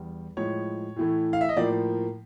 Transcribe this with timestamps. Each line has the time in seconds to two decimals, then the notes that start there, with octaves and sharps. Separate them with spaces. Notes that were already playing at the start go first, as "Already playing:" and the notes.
Already playing: E2 E3 G3
0.37 A2 F3 G#3 C#5
0.96 A2 E3 A3
1.33 F5
1.41 E5
1.49 D#5
1.57 A2 F3 A#3 D5